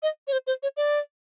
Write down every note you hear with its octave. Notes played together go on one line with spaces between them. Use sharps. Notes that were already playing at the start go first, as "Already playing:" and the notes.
D#5
C#5
C5
C5
C#5
D5